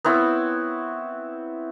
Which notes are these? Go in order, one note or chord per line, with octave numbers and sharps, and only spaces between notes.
B3 C4 E4 C#5